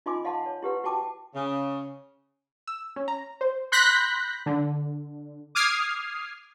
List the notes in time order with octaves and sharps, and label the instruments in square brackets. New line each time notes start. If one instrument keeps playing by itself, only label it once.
[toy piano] D#4 F4 D#5 G#5 C6 D6
D#5 F5 F#5 A5 C6
C#5
E4 G4 B4 F#5 C6
E4 F#4 G5 A5 D6
[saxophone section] C#3
[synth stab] E6
C#4
A#5
C5
B5 C6 F#6 G6 A#6 B6
D3
D6 D#6 F6 G#6 C7